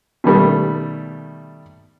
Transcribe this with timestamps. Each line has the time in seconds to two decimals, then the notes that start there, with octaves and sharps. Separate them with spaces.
0.24 B2 D#3 G3 A3